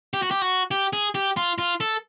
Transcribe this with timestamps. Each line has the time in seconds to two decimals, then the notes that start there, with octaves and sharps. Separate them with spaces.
0.14 G4
0.22 F#4
0.31 G4
0.42 F#4
0.71 G4
0.93 G#4
1.15 G4
1.37 F4
1.58 F4
1.80 A4